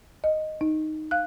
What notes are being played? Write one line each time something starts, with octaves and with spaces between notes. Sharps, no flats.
D#5
D#4
F5 F#6